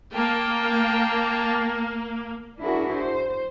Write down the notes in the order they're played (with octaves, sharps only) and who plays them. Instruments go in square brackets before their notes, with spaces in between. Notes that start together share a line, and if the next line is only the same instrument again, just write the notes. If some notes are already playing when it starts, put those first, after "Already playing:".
[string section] A#3 [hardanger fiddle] G5 A5
[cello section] D4 E4 F#4 G#4 A#4
C5